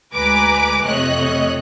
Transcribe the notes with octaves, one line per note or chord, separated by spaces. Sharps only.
D2 G#3 B4 G#5 A#5 D6
F2 C3 A3 C#5 D#5 F#6